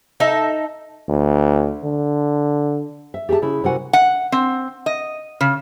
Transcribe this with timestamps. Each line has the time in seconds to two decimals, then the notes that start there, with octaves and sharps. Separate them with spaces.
0.20 D#4 A4 E5
1.09 D2
1.84 D3
3.14 E5
3.29 G4 G#4 E5 A5
3.42 C#3 E4
3.64 C3 E4 F#4 A#4 F#5 G#5
3.93 F#5
4.32 C4
4.86 D#5
5.41 C#3